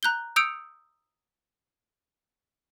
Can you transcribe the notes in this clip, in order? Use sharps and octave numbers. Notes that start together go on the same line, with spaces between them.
A#5 F#6 G6 G7
D#6 E6 G6 C#7 D7 F7